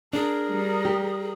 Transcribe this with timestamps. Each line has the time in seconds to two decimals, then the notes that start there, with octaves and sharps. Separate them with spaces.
0.13 D4 G#4 A#4
0.49 G3
0.85 G4